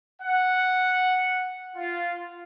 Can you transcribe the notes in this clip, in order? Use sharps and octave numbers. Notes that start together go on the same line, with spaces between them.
F#5
F4